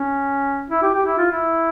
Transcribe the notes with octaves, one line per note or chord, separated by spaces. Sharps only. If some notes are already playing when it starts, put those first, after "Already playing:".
Already playing: C#4
E4
G4
G4
E4
F4
E4